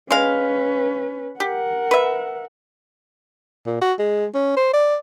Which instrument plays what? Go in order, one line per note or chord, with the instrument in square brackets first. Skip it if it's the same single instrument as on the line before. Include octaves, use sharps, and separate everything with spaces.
[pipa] G#3 F5 [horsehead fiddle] C#4 B4
[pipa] G4 [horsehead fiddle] A#4 F#5
[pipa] B4 E5
[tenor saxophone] A#2
F#4
G#3
C#4
C5
D5